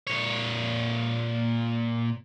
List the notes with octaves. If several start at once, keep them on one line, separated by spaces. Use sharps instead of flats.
A#2 C#5